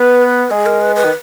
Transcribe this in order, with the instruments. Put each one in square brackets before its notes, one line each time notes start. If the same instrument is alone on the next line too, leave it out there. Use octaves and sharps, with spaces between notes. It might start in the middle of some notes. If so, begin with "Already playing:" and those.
Already playing: [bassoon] B3 [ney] B4
[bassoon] G#3 [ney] G#4
[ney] A#4
B4
B4
[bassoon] D#3